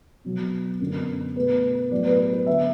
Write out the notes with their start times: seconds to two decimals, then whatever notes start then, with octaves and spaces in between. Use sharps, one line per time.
0.24 B2 F#3 B3
0.80 F#2 D3 B3
1.36 B2 A3 B4
1.91 A2 F#3 B3 D5
2.05 B4
2.19 B4
2.33 B4
2.46 D3 B3 E5